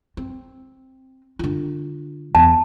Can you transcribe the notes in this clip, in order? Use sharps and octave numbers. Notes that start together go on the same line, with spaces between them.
C4
D3 F4
E2 A5